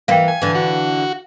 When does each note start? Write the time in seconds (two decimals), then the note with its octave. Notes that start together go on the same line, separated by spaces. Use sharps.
0.08 E3 A#3 F5 G5
0.28 G#5
0.41 D3 E3
0.55 F#4